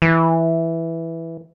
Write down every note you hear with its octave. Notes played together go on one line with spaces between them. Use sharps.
E3